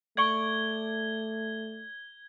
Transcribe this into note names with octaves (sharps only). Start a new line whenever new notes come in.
A3 D5 C#6 G#6 G7